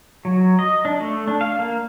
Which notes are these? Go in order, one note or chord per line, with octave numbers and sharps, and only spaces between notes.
F#3
D#5
D4
A3
D4
F5
A#3